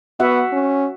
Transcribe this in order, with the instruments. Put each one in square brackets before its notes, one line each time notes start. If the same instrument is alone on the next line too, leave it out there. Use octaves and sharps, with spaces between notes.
[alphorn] B3 [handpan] F#4 E5 F#5
[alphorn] C#4